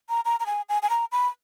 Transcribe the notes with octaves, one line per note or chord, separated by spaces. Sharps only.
A#5
A#5
A#5
G#5
G#5
G#5
A#5
B5